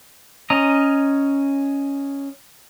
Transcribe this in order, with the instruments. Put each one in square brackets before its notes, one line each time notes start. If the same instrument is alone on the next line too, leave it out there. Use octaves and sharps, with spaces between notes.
[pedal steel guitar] C#4 D#5 A#5